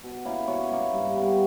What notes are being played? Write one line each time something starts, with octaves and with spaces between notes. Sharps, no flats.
B2
A#3 C#4 E4
B2 C#5
A#3 C#4 E4
G2
G3 B3